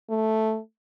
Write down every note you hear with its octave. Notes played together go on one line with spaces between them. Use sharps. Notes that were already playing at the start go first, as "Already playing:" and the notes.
A3